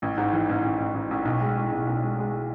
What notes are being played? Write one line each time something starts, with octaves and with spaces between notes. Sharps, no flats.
A1
G#2
E3
A1
A1
A1
A1
A1
B1
G#3
G#3
B1
B1
G#3
G#3